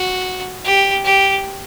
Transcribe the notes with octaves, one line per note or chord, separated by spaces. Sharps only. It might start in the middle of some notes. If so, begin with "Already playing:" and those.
Already playing: F#4
G4
G4